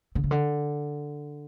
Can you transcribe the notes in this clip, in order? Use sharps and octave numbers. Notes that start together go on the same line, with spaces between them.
D3
C#3
D3